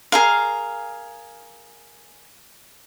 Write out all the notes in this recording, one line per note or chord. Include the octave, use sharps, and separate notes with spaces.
G#4 A#4 F5